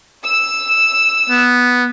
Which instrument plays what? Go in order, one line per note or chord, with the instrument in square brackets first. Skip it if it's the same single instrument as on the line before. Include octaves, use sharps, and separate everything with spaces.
[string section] E6
[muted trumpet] B3